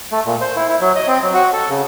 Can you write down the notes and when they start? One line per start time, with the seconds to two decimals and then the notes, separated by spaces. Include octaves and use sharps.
0.12 A3
0.26 A#2
0.41 C5
0.56 E4
0.68 E4
0.81 F#3
0.95 D#5
1.07 C4
1.22 F#3
1.34 F#4
1.52 A4
1.69 C#3